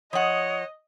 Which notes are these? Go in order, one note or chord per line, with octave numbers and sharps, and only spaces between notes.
F3 C#5 D#5 F#5